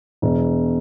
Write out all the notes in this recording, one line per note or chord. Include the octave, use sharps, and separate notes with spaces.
E1